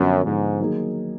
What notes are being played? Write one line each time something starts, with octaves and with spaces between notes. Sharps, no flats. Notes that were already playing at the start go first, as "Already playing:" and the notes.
Already playing: F#2 D3 F3 B3
G#2 D3 F3 B3
D#3 F#3 A#3 D#4 G#4